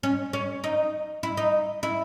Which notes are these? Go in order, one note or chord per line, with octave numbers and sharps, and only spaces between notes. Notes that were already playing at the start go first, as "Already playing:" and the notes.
C#4
C#4
D#4
E4
D#4
E4